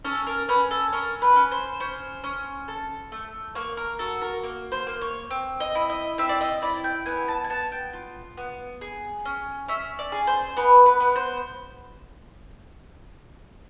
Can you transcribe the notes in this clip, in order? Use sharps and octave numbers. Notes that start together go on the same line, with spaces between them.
C#4 A4
A#4
C#4 B4
A4
C#4 A#4
B4
C#4
C5
C#4 C5
C#4
A4
A3
A#3 C#5
A#4
F#4 A4
A#4
A#3
C5
A#3
C#5
C4
D#5
E4
D#5
C4 E5
D5
D#5
E4 D5
G5
B3 G#5
A5
G#5
B3 A5
G5
F4
B3
G#4
C#4
C#4 E5
D5
G#4
C5
B3 B4
B4
B3
C5